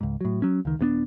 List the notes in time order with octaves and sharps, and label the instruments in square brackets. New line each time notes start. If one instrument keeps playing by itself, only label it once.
[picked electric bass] C#2 G#2
A2 F#3
F#3 C#4
C#2 D#3
D#1 G2 B3 D4